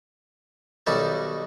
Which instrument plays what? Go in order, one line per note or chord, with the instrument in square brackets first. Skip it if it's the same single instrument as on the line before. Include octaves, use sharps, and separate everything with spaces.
[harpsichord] B1 D#3 G3 F#4 G4 A5